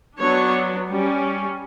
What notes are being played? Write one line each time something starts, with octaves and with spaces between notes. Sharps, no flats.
F#3 B3 D4 C#5
G3 C#4